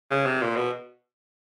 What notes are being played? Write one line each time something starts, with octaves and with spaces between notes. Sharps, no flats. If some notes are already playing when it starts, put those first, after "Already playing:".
C#3
C3
A#2
B2